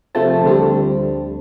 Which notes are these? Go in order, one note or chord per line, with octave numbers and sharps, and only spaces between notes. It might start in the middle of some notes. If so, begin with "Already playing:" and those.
C3 F3 A3 C4 A5
D2 D3 G3 C4